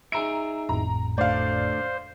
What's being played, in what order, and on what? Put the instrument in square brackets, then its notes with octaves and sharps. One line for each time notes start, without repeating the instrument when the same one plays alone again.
[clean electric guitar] D#4 G#4 E5 [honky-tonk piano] A#5 D7
[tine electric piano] G#1 F2 A2 [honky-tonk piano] A#5
[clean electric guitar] D3 A3 [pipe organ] C5 [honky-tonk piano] D5 F5